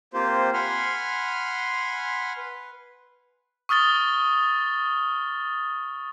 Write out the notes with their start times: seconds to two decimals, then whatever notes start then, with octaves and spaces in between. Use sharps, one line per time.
0.14 A#3 C4 F4 G4 C5
0.54 F#5 G#5 B5 C6 F6
2.37 B4
3.69 C#6 D#6 F6 A6 G7